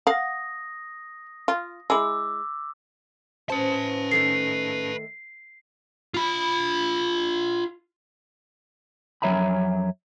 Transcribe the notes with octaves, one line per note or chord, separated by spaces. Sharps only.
F5 F#5 D#6 A#6
F4
G#3 E4 D6 E6
C#4 B4 C5 A5
D#3 A3 D#4 C7
F4 B5
F2 F#3 C#5 E5 A#5 B5